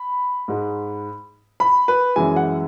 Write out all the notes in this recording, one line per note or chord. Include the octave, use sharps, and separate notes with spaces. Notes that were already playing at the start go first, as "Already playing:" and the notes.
Already playing: B5
G#2 G#3
B5
B4
F#2 E3 G#3 G#5
F#5